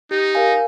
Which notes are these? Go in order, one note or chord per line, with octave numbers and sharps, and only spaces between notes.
D#4 G4
A#4 F5 G#5